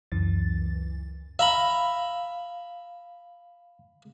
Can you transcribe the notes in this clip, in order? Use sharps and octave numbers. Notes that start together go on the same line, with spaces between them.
C#2 F#2 E3 A6
E5 F5 A#5 B5